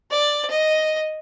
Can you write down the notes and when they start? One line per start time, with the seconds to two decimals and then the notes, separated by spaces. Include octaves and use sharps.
0.11 D5
0.50 D#5